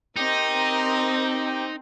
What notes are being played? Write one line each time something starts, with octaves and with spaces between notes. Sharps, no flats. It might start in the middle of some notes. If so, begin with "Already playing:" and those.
C4 D#4 G4 A#4 D#5 G5